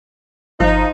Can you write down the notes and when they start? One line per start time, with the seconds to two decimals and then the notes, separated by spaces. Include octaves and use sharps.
0.60 G1 F3 D#4